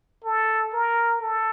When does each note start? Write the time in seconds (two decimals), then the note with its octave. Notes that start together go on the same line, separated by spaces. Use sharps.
0.24 A4
0.73 A#4
1.22 A4